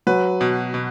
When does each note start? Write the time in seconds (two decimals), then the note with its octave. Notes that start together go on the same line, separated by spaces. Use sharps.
0.07 F#3 B4
0.41 B2
0.74 B2